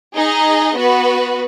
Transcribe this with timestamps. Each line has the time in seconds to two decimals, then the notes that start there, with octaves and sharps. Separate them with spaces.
0.16 D#4 G#4 D#5
0.76 B3 F#4 B4